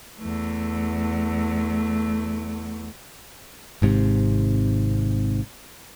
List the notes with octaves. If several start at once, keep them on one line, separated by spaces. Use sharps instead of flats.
E2 A3
G#1 G#2 C3